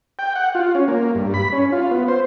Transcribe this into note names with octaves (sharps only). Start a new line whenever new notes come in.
G5
F#5
F4
C#4
A#3
G2
B5
C#4
F4
B3
C5